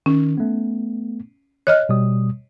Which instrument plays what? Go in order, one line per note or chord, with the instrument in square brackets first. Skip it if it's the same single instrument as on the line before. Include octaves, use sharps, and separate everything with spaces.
[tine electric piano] D#3 [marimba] C#4
[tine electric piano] A3 B3
[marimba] C#5 D#5 F6 [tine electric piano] F#6
[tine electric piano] B2 G3 D#6